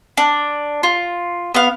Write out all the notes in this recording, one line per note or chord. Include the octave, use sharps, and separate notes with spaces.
D4
F4
B3 F5